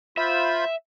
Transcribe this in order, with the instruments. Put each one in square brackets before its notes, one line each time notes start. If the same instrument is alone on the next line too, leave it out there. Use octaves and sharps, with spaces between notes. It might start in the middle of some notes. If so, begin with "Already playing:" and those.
[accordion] F4 C5 B5 [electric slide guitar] E5